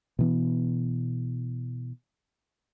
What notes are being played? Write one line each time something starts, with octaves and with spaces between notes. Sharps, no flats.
B2 E3 B3